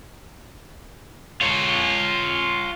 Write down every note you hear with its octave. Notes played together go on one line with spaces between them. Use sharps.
F4 C#5